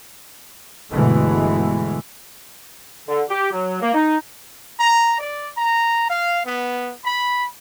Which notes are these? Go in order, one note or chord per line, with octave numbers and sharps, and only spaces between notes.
G1 B2 D3 E3 G#3 A3
D3
G4
F#3
A#3
D#4
A#5
D5
A#5
F5
B3
B5